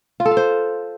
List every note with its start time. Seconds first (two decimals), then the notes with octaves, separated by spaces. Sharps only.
0.20 F4
0.26 A4
0.31 F5
0.37 C5